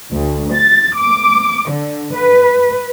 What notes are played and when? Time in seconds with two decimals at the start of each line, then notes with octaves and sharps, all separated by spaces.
0.12 D2
0.54 A6
0.98 D6
1.69 D3
2.14 B4